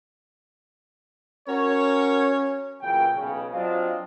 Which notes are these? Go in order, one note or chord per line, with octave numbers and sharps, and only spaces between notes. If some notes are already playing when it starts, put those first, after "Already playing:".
C#4 F#4 A#4 C#5
A#2 C#3 E3 F#3 G5
B1 C#3
F#3 C4 D4 F4 D#5 F5